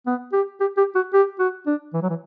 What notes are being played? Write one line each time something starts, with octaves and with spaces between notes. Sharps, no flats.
B3
G4
G4
G4
F#4
G4
F#4
D4
E3
F#3
E3